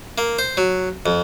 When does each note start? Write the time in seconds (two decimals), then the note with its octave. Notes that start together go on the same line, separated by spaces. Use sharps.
0.18 A#3
0.39 C5
0.57 F#3
1.06 F2